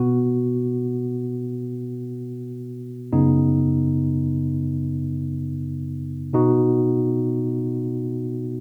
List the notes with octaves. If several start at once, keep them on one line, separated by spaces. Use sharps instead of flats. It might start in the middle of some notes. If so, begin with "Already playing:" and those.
Already playing: B2 B3 F#4
F#2 C#3 B3 D#4
B2 B3 D#4 F#4